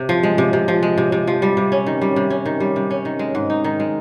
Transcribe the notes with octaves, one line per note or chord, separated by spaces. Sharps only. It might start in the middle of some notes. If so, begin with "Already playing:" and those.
Already playing: C3
F3
G#3
C3
C3
F3
G#3
C3
C3
F3
G3
C3
C#4
D#3
G3
C3
C#4
D#3
G3
C3
C#4
D#3
G#3
G#2
D#4
D#3
G#3